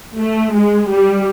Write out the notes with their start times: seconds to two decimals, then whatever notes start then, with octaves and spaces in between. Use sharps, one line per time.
0.18 A3
0.54 G#3
0.89 G3